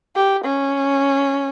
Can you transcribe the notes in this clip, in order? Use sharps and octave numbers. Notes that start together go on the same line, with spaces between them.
G4
C#4